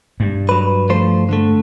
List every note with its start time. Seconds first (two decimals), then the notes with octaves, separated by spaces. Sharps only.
0.20 G2
0.49 F#3 B4
0.90 F3 A3 C5
1.29 D3 A3